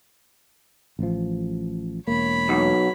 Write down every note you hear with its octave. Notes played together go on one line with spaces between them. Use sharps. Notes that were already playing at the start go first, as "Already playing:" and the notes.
A1 F3
E1 A#3 C#5 B5
B1 F#3